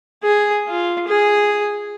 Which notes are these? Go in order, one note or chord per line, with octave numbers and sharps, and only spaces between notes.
G#4
F4
G#4